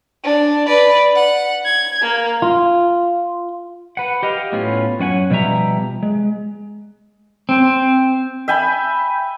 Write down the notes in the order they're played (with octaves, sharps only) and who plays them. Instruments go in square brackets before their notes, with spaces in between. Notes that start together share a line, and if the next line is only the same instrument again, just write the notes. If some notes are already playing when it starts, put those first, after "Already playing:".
[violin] D4
B4 D5
F#5
G#6
A#3
[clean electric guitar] F4
[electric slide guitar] B4 F#5
G4 D#5 F5
A2 B3 C#4 F4
F#2 C#4 F#5 G#5
B2 F3 G3 G4 E5 A#5
G#3
[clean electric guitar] C4
[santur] E5 G5 G#5 B5